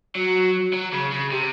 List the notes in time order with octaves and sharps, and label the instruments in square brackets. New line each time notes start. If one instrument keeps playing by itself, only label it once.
[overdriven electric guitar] F#3 [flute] F#4
[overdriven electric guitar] F#3
C#3
C#3
[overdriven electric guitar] C3 [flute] G4